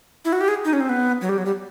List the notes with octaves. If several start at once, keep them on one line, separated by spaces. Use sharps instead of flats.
E4
F#4
G4
G#4
D#4
C#4
C4
B3
F#3
G3
F#3
G3